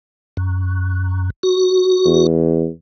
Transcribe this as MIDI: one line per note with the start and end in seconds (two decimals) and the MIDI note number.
0.37 1.30 42
1.43 2.27 66
2.06 2.68 40